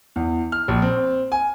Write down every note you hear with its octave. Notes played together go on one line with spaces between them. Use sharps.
E2
F6
A#1
C4
G#5